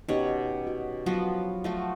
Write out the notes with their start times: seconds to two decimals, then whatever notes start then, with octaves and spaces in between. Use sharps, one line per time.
0.08 B2 C#4 D#4 G4 C#5 F#5
0.67 F#4
1.06 F3 F#3 B3 F#4
1.64 F3 A3 F#4